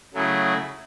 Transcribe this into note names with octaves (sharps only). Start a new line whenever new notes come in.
C#3 F#3 A3 E4 G#4